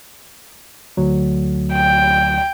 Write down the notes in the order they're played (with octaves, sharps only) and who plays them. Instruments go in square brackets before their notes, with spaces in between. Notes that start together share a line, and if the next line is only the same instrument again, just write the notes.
[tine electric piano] D2 F#3
[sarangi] G5